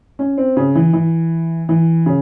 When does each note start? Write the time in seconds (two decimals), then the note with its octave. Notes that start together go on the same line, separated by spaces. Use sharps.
0.19 C#4
0.38 C4
0.57 C#3
0.75 E3
0.93 E3
1.69 E3
2.06 C#3